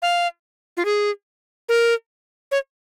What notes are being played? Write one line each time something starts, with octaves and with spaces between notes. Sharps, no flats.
F5
F4
G#4
A#4
C#5